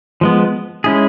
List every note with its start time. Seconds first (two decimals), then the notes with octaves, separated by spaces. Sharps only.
0.21 F3 G#3 B3
0.84 G#3 C#4 E4 G#4